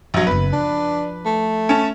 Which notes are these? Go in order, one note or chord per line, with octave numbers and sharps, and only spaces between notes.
A#1 F#3
F#1 B3 B4
F3 D4
A3
C#4 A5